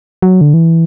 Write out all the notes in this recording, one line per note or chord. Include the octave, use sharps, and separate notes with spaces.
F#3
D3
E3